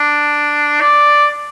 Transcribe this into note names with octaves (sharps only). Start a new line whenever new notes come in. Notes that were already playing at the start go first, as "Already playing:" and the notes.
Already playing: D4
D5